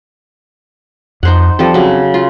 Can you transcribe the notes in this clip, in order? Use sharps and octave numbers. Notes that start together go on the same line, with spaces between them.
F2 D#4 C5 F#5
F3 G3 C4 A4
C#3 F#3
F4